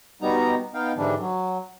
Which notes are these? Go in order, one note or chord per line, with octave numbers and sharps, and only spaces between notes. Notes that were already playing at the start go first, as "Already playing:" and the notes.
B2 G3 B3 D#4 A#5
B3 D#4 F5 G5
G#2 D3 E3 G3 D4
F#3